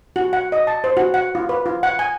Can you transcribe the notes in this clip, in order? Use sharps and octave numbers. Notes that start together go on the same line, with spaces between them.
F#4
F#5
D#5
A5
C5
F#4
F#5
F4
B4
F4
F#5
G#5